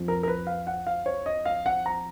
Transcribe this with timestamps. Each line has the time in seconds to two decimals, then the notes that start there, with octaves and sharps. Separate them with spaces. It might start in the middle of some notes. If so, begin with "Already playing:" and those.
Already playing: F2 F3
0.08 A#4
0.23 A#4
0.28 B4
0.47 F5
0.67 F#5
0.87 F5
1.06 C#5
1.26 D#5
1.45 F5
1.66 F#5
1.86 A#5